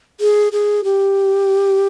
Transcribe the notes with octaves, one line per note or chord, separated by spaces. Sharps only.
G#4
G#4
G4